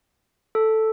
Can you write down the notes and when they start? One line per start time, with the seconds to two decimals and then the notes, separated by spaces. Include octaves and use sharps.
0.55 A4